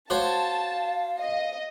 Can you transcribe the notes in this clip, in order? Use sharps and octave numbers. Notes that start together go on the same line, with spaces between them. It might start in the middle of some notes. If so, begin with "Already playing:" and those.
F#4 C5 C#5 F5 A5
D#5